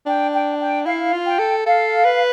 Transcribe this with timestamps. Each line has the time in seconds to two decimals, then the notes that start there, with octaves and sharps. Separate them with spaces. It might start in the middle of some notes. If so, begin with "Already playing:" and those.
0.06 D4 G5
0.33 G5
0.60 G5
0.86 E4 F5
1.12 F4
1.26 G5
1.39 A4
1.65 A4 F5
2.05 B4